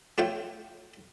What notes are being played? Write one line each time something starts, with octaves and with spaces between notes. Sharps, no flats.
A3 F4 G4 C#5 G5